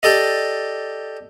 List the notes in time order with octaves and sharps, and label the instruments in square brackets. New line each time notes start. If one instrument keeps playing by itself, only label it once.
[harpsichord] G4 A4 D5 D#5